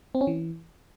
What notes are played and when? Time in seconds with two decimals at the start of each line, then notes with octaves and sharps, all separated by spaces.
0.15 C4
0.21 C#4
0.27 E3